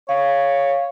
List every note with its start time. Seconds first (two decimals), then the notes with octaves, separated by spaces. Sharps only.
0.09 C#5 F5